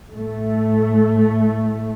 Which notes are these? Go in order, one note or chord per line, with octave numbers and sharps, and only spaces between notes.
A2 A3